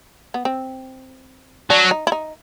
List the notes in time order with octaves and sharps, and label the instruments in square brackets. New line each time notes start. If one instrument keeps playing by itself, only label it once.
[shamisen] B3
C4
[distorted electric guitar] F#3 [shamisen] D4
[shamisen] D#4
E4
D#4